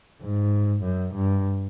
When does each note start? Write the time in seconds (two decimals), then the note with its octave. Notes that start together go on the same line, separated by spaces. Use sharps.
0.22 G#2
0.83 F#2
1.15 G2